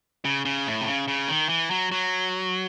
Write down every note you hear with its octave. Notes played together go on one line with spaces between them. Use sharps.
C#3
C#3
A2
C3
C#3
C#3
D#3
E3
F#3
F#3